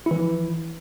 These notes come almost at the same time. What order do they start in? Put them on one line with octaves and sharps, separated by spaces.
E4 E3 F3